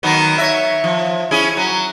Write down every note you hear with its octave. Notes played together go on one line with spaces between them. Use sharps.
D#3 F#3 B3
C#5 E5
F3
C#4 E4 G#4
F#3